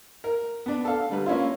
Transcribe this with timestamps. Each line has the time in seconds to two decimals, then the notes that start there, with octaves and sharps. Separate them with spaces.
0.24 A#4
0.66 B3 D4
0.85 A4 F5
1.09 D3 G3 B4
1.26 A#3 C#4 E4 F4